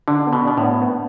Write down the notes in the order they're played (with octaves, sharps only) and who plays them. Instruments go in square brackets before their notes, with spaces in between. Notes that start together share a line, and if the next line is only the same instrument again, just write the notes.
[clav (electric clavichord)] D3 [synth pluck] D4
[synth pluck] B3
[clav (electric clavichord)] B2
[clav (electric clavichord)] B2 [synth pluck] D4
[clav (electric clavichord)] A2
[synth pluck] B3
B3